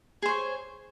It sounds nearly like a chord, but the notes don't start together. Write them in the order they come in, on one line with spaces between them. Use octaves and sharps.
G#4 C5 C#5